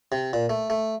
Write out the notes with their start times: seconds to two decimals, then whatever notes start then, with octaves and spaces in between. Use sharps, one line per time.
0.12 C3
0.33 A#2
0.49 A3
0.70 A3